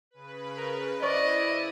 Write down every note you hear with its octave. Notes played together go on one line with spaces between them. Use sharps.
C#3 B4
A#4
E4 C5 D5 D#5 B5 C#6